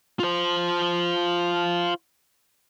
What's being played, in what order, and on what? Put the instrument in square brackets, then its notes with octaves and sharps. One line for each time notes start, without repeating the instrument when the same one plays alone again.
[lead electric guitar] F4 C5